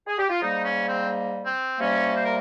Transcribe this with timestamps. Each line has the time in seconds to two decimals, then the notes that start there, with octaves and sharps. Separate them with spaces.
0.07 G#4
0.18 G4
0.30 F4
0.41 G#2 G3 A#3 D#4
0.63 C#4
0.87 C4
1.45 C4
1.79 C3 G3 A#3 C#4
2.14 C5
2.24 A#4